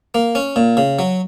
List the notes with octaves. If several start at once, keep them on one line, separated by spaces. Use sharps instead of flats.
A#3
C#4
A#2
C#3
F#3